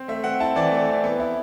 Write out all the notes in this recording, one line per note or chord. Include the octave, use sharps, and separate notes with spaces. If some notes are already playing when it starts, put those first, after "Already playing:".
Already playing: C4
A3 E5
C4 F#5
E4 A5
E3 D5
A3
C4
B3
E4